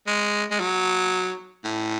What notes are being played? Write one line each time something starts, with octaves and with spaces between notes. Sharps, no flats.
G#3
G#3
F#3
A2